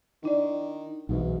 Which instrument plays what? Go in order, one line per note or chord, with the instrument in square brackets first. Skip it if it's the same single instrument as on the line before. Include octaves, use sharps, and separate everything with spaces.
[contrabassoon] D#3 [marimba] D4 E4 D5
[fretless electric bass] B1 B2 E3 [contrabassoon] G#2